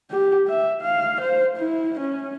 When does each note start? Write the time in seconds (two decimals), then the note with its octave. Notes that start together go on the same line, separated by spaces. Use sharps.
0.10 G4
0.48 E5
0.82 F5
1.21 C5
1.57 E4
2.00 C#4